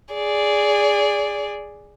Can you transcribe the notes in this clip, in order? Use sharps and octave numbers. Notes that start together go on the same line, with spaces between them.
G#4 D5